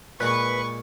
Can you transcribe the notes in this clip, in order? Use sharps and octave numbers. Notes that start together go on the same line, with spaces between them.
A#2 G#3 B4 C#6